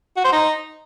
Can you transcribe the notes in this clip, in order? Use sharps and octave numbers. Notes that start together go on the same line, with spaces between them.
F#4
C5
D#4